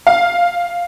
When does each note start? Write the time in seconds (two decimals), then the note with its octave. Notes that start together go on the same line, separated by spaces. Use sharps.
0.07 F5